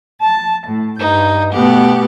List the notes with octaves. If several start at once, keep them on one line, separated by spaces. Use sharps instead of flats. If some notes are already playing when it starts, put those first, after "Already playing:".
A5
A2
G2 D#4 G6
B2 A3 B3 G4 F#5